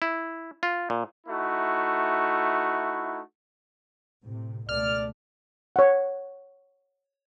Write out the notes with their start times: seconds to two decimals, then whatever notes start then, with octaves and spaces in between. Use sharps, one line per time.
0.02 E4
0.63 F4
0.90 A#2
1.27 A3 D#4 E4 F#4
4.25 A2 C3
4.69 C#2 B2 A3 D5 F6
5.76 C#5 F#5